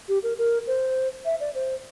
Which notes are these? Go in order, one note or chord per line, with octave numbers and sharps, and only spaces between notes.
G4
A#4
A#4
C5
E5
D5
C5